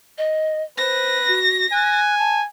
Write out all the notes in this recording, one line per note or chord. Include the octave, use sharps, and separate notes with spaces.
D#5
B4 C5 A#6
F#4
G#5 F#6
A5